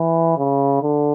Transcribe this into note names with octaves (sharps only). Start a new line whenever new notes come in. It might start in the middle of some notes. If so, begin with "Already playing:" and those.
Already playing: E3
C#3
D3